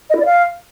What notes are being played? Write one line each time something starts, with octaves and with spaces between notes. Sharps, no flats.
D#5
E4
D5
F5